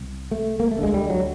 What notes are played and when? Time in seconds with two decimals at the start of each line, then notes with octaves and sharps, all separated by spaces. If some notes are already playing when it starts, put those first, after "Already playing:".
Already playing: C2
0.31 A3
0.60 A#3
0.71 A3
0.78 D2 D3 G#3
0.94 G3
1.10 F#3